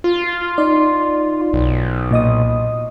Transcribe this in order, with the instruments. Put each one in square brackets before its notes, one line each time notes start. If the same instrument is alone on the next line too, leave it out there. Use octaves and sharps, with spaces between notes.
[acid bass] F4
[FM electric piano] D#4 D5
[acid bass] B1
[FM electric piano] A#2 D#5 D#6